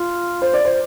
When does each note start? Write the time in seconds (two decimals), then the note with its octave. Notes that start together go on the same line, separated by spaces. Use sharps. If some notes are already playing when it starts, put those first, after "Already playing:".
Already playing: F4
0.42 C5
0.53 D5
0.65 C5